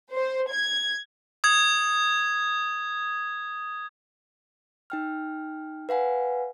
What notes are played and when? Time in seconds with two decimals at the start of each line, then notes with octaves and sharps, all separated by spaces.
0.11 C5
0.50 G#6
1.44 D#6 G#6
4.90 D#4 G5 F6
5.89 B4 F5 F#5 G#5